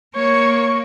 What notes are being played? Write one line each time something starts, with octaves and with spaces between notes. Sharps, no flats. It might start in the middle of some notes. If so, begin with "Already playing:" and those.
A#3 C#5 C#6